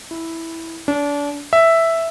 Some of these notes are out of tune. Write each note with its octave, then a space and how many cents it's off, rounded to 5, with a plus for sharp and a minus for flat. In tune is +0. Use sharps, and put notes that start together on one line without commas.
E4 -5
D4 -30
E5 +0